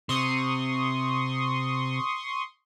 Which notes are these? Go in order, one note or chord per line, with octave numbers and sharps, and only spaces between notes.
C3 C6 C#6 D#6